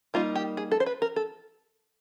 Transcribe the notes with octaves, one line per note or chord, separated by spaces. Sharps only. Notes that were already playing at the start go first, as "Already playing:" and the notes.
G3 A#3 D#4 F4
G4
G#4
A4
C5
B4
A#4
A4